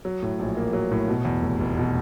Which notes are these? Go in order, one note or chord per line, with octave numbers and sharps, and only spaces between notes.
F#3
A2
A#1
A#3
F#3
A2
B2
E2
F1
F1
B2